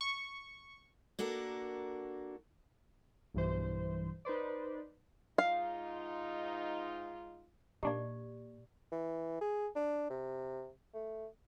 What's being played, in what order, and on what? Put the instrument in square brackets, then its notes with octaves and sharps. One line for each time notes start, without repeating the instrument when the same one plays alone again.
[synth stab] C#6
[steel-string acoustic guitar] A#3 D4 F#4 A4 A#4
[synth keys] B1 G2 E3 C5
D#4 B4 C5 D5
[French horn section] G#2 D#4 F4 [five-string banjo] F5
[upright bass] A#2 [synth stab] A#3 D4 D#4 [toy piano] G4 D5
[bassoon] E3
G#4
D4
C3
A3